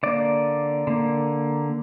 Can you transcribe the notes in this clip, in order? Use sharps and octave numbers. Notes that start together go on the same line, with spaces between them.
D3 A#3 D5
D3 A#3